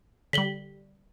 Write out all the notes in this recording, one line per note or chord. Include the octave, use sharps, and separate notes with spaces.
D3 G3 B6 F#7 G7